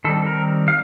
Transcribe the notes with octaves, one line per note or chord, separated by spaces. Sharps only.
D#3 G3 C4 A4
A#4
F5